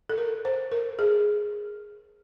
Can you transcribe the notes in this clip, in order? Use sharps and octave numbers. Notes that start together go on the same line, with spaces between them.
A4
A#4
C5
A#4
G#4